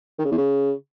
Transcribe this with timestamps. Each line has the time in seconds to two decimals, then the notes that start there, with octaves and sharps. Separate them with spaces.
0.19 D#3
0.25 C#3
0.31 E2
0.38 C#3